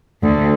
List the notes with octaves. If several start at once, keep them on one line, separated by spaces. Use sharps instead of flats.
D2